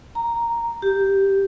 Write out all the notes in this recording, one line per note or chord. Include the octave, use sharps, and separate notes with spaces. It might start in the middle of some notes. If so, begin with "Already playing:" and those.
A#5
G4